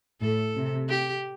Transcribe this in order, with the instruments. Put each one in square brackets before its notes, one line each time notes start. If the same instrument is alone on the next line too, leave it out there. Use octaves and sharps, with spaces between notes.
[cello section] A2 [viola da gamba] A4
[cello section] C3
[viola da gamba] G4